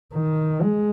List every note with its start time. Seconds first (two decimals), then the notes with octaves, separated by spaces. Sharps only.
0.14 D#3
0.62 G#3